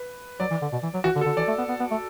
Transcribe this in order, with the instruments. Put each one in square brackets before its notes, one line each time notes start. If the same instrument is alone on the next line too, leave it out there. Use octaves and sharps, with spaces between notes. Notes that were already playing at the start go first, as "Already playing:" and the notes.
Already playing: [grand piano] B4
[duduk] F#3 [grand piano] D5
[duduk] E3
D3
B2
E3
F#3
[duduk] E3 [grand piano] F#4
[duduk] D3
[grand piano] A4
[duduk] D3
[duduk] E3 [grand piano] D5
[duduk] A3
B3
B3
B3
A3